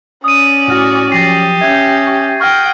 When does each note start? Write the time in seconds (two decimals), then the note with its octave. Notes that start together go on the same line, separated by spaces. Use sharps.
0.24 C#4 D5 D#6 D#7
0.68 A2 F#4 F6
1.12 F3 F#3 G4 A6 A#6 C7
1.61 C#4 E5 G6 G#6
2.07 C#6
2.40 F#5 G5 C#6 F6 A#6